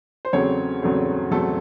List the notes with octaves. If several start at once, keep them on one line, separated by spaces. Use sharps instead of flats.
C5
E2 C#3 F#3 A3 C4 C#5
E2 C#3 F#3 A3 C4
E2 C#3 F#3 A3 C4 A4